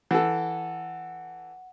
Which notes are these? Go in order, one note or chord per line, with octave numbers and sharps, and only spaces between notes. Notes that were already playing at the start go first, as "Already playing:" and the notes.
E3 A4 F#5